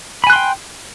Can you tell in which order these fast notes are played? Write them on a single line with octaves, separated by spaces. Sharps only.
B5 G#5 F#6 C6 G5